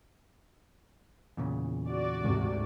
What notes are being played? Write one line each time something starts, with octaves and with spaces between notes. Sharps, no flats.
E2 A#2 C#3
F#4 D5
D2 G#2 C3